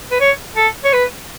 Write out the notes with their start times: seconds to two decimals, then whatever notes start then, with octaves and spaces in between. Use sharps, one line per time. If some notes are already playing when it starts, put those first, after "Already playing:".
0.11 B4
0.20 C#5
0.57 A4
0.85 C#5
0.93 B4